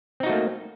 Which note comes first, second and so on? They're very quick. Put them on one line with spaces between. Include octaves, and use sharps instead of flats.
C4 D#4 F#4 A3 A#3